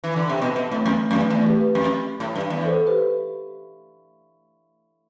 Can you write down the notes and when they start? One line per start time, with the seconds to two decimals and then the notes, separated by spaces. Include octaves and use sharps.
0.04 E3
0.16 D3
0.29 C3
0.41 B2 B3
0.56 B2
0.71 A2 A3 C4
0.86 F2 B3
1.01 A3
1.11 F2
1.16 G2 B3
1.30 E2 A3 C4
1.45 G4 B4
1.60 G4 B4
1.75 F2
2.20 A2
2.35 G2
2.50 E2
2.65 A4 C5
2.87 G4 B4